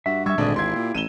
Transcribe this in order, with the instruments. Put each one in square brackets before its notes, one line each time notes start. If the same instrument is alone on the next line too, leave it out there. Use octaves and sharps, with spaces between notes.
[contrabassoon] G2 [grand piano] F#4 [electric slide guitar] E5
[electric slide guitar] G3 E5 [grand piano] C#6 E6 G#6
[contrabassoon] G#1 [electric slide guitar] A#2 G#4 [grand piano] D3 A3 D4
[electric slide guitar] E4 F4 G4 [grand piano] C6 G#6
[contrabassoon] A#2
[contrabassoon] A1 [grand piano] D#7 E7 G7